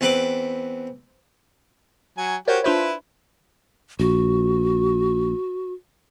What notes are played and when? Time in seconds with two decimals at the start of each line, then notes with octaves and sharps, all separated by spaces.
0.01 E2 C4 B4 B5 D6
2.18 F#3 G#5
2.48 F#4 G4 A#4 C5 C#5
2.64 D4 E4 F4 B4 C5
3.99 A#1 F#4